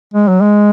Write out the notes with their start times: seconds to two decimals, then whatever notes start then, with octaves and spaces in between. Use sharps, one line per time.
0.14 G#3
0.28 F#3
0.41 G#3